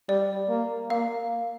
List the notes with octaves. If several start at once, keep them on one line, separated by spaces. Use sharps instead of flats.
G3 D5
A#3
A#3 F5